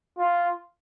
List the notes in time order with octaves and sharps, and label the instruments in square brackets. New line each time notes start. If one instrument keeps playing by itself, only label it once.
[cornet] F4